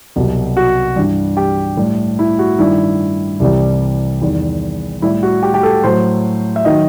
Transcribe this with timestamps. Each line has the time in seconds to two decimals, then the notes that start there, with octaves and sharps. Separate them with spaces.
0.16 C2 B2 F#3
0.57 F#4
0.96 G2 E3 G3
1.37 G4
1.77 A2 G3
2.19 E4
2.39 F#4
2.59 G2 D#3 G3 E4
3.40 C2 C3 E3 G3
4.21 E2 D#3 G3
5.02 A2 G3 E4
5.23 F#4
5.43 G4
5.54 G4
5.63 A4
5.84 A2 F#3 C5
6.56 E5
6.65 D#3 F#3 D#5